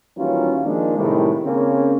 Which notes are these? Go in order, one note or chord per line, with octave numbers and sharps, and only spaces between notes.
D#2 E3 F#3 G3 C#4 F4
D#3 F3 G#3 A#3 D4
A2 C3 D#3 G3 G#3
C#3 A#3 C4 C#4